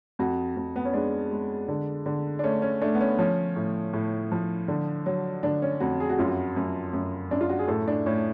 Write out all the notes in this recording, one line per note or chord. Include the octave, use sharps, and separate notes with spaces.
F2 F#4
F2
B3
C#4
G#3 D4
G#3
D3
D3
D4
A3 C#4
C#4
A3 D4
B3
C#4
F3 C#4
A2
A2
F3
D3
F#3
D3 D4
C#4
F2 F#4
G#4
F#4
F#2 F4
F#4
F#2
F#2
F#2 D4
F4
F#4
G#4
A2 A4
D4
A2 C#4